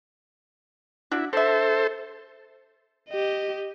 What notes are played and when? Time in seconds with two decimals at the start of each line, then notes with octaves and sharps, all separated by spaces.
1.11 D4 E4 F#4
1.33 D3 A4 C5 E5
3.10 G4 D#5